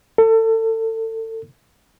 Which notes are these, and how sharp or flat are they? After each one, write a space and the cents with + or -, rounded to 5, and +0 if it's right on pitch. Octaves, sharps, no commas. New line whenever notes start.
A4 +30